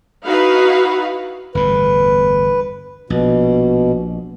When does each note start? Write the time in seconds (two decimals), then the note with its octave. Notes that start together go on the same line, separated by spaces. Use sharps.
0.25 D#4 E4 F#4 B4 F5
1.55 G1 E2 A2 B4
3.10 A#1 B2